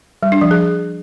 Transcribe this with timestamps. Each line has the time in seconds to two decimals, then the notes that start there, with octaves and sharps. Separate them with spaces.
0.23 G3
0.32 D4
0.41 F3
0.51 G#4